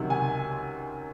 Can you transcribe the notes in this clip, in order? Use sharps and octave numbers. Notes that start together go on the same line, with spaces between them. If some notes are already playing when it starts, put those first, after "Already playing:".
Already playing: C#2 C3 D#3 F#3
G#5